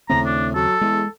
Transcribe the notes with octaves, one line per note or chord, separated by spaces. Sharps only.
D#2 A2 C#3 C4 A#5
D4
F#3 A4
E2 G#3